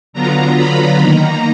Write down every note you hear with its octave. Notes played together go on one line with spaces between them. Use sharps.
D3 F#3 B3 F4 A#5
B5
D#3 A#3 D#4 A#5